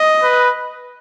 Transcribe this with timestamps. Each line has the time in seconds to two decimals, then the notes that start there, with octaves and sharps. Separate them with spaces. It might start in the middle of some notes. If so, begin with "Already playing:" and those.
Already playing: D#5
0.23 B4